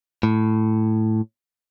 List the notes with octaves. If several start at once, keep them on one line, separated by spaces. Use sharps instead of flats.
A2